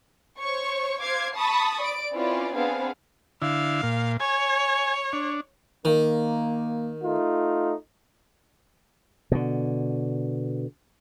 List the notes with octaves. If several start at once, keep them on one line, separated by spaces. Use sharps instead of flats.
C5 C#5 C#6
C5 F5 D6 G#6 C7
A5 B5 C#6 D#6
D5 D7
C4 C#4 E4 F4 B4 D5
B3 C4 D4 G#4 F5
D3 E4 F5
A#2
C#5 G#5
D4
D#3 A#3
A3 D#4 F4
B2 D3